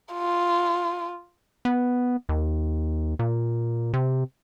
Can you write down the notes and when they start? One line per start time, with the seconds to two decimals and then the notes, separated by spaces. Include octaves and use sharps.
0.14 F4
1.65 B3
2.29 D#2
3.19 A#2
3.93 C3